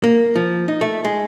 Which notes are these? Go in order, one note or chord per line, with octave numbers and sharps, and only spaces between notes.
A#3
F3
D#4
A3
G#3